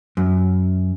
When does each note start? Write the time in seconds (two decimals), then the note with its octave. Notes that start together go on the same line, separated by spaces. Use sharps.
0.17 F#2